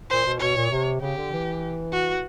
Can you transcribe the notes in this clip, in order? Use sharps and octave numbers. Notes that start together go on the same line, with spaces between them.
A#2 C5
B2
B2 C#5
A#2
C3
C#3 G4
D3
E3
F#4